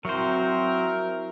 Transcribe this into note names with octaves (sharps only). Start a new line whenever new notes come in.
F#3 C4 E4 F#4 A#4 C5 E5